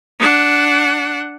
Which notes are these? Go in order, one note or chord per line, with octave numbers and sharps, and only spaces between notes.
D4 F#5